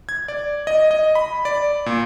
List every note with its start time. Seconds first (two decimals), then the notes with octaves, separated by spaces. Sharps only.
0.09 G#6
0.28 D5
0.67 D#5
0.91 D#5
1.15 B5
1.45 D5
1.86 A#2